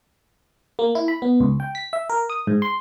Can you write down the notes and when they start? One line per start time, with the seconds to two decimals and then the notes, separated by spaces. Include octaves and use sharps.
0.79 A#3
0.95 E4
1.08 B5
1.22 B3
1.40 C#2
1.60 G5
1.75 B6
1.93 E5
2.10 A#4
2.30 D#6
2.47 G#2
2.62 C6